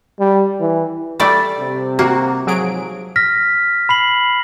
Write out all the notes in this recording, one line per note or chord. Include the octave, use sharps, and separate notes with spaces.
G3
E3
G3 A3 D5
C3
A#3 F#4
G#2 C3 F3 F#3 G#4 D7
F6 A#6 B6
B5 C7 F#7